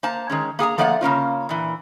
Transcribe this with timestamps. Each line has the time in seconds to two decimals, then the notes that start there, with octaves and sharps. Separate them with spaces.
0.03 A#3 C5 A5 A#5
0.30 D#3 G#3 C#4
0.59 A#3 G#4 G#5 A#5
0.78 F3 A3 A#3 D5 F5 F#5
1.01 C#3 A#3 C#4 F4
1.49 A#2 E3